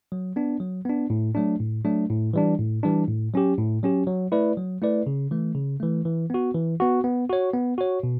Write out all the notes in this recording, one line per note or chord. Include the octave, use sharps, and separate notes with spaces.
F#3
B3 D4
F#3
B3 D4
A2
F#3 A3 D4
A2
F#3 A3 D4
A2
E3 G3 D4
A2
E3 G3 D4
A2
F#3 C#4 G4
A2
F#3 C#4 G4
F#3
A3 E4 B4 D5
F#3
A3 E4 B4 D5
C#3
E3 A3
C#3
E3 A3
E3
B3 F#4
E3
B3 F#4
B3
F#4 C#5
B3
F#4 C#5
B2